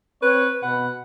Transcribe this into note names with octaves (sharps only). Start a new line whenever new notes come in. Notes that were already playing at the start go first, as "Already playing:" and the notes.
C4 B4 C#5
B2 F#5 B5